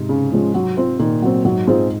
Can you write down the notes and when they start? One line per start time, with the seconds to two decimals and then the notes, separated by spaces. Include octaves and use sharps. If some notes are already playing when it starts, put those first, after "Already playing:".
Already playing: G#2 C3
0.09 C#3
0.32 F3 G#3 C#4
0.54 F#3
0.77 C4 F4 C5
0.99 A#2 D#3
1.22 F#3 C4
1.45 G#2 F#3
1.67 G#2 C4 F4 G#4 C5